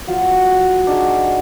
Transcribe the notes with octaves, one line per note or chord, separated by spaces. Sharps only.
F#3 F4
D4 D#4 F#4 G#4